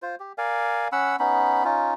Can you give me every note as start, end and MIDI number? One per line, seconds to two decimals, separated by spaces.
0.02 0.15 65
0.02 0.15 72
0.20 0.33 67
0.38 0.88 70
0.38 0.88 74
0.38 0.88 77
0.38 0.88 80
0.92 1.16 61
0.92 1.16 78
0.92 1.16 83
0.92 1.16 88
1.19 1.64 59
1.19 1.64 61
1.19 1.64 63
1.19 1.64 83
1.64 1.94 61
1.64 1.94 63
1.64 1.94 65